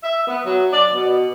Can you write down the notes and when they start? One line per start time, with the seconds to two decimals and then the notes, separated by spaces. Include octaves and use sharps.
0.03 E5
0.28 B3
0.45 F#3
0.73 D5
0.94 B2